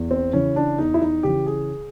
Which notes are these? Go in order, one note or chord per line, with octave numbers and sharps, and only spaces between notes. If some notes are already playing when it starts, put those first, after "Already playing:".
Already playing: E2
C4
C#3 E3 C#4
D4
E2 D#4
E4
D#4
C#3 E3 G4
G#4